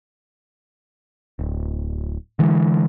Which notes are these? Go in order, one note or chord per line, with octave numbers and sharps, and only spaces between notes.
D1
D3 E3 G#3